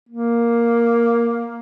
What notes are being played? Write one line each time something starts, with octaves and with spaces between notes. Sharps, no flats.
A#3